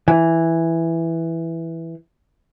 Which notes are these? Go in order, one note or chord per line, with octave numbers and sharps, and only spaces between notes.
E3